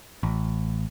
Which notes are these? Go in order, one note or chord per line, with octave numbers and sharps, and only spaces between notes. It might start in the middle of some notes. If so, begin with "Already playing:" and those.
A1